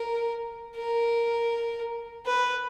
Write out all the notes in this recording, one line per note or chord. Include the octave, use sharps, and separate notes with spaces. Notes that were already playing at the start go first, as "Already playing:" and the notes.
Already playing: A#4
A#4
B4